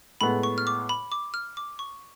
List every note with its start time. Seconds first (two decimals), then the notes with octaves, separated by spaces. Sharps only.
0.21 A2 G#3 B3 B5
0.43 C#6
0.58 F6
0.67 D6
0.89 B5
1.12 D6
1.34 F6
1.57 D6
1.79 C#6